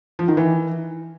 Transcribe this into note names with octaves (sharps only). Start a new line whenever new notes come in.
F3
D#3
E3